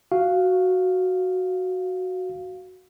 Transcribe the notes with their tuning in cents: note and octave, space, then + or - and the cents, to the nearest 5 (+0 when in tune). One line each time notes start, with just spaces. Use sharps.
F#4 +0 F5 +0